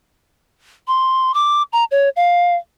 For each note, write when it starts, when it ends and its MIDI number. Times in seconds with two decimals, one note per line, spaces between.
0.88 1.34 84
1.34 1.63 86
1.73 1.84 82
1.91 2.09 73
2.16 2.56 77